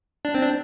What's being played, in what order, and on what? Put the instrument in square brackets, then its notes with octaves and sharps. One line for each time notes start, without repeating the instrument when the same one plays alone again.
[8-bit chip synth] D4
C4
D4